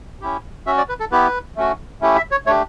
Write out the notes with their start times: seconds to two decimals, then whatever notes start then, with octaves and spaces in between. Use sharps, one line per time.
0.21 C#4 E4 G4
0.66 C#4 F#4 E5
0.78 D5
0.89 B4
1.00 A4
1.12 B3 E4 G4 B4
1.57 A3 C#4 F#4
2.01 A3 C#4 E4 G4
2.17 E5
2.31 C#5
2.46 A3 D4 G4 C#5